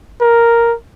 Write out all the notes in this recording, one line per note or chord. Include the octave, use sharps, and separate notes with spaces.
A#4